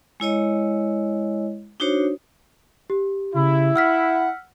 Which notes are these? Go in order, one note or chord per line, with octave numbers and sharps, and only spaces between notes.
G#3 E4 C#5 D#5
D4 D#4 F#4 C5 C#5
G4
C#3 E4
F#5 E6 F6 B6